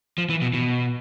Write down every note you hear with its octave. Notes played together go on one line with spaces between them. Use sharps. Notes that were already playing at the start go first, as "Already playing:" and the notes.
F3
E3
B2
B2